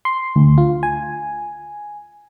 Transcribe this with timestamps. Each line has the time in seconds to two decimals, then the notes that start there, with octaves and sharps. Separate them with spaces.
0.05 C6
0.36 D2
0.58 F4
0.83 G#5